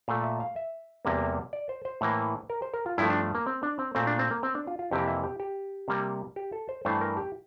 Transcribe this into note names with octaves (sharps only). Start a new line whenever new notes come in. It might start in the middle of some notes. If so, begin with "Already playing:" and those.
A#2 A3 F5
E5
F5
E5
E2 C3 G3 A#3
D5
C5
C5
A2 E3 A#3
A#4
C5
A#4
F4
G2 F3 A3 E4
D4
A#3
C4
D4
C4
A#2 A3 C4
D4
C4
A#3
C4
D4
F4
F4
F2 C3 E3 A#3 G4
E5
G4
G4
C3 G3 A#3
G4
A4
C5
G2 E3 A3 C5
A#4
G4